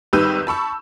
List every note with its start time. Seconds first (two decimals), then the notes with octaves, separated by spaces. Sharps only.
0.13 G#1 G3 D#4 B4 E6 G6
0.47 A5 B5 C#6 E6